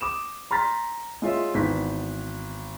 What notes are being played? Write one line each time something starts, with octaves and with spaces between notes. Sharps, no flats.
D6 D#6 E7
A#5 C6 F6 A6 B6
G#3 F4 C#5 E5
G#1 E3 B3 B6